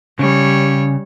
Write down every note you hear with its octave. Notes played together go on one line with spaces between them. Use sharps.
C#3 G3 C#5